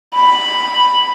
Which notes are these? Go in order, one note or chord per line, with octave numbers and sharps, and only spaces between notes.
B5